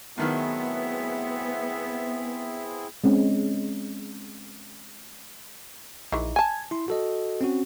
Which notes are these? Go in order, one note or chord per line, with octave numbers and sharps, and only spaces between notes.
A2 D#3 F#3 B3 C4 E4 G#4 E5
G#3 C4 C#4
A#1 D#3 E3
G#5 A5 G#6
E4 C6
F#4 A4 D#5
C4 C#4 F#4